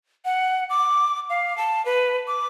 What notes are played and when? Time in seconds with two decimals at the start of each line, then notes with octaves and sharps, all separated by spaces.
0.25 F#5
0.70 D6
1.29 F5
1.57 A5
1.85 B4
2.27 D6